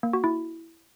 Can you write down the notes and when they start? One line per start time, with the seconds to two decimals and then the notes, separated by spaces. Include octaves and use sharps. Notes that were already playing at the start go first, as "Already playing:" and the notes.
0.03 A#3
0.13 F#4
0.24 E4